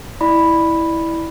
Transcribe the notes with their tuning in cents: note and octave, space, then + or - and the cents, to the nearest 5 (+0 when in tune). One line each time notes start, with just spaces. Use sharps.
E4 -10 D5 +25 B5 +0